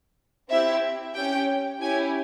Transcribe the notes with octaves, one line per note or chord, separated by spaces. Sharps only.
C4 E4 G4 E5
C#4 G4 G5
C#4 E4 G4 G#5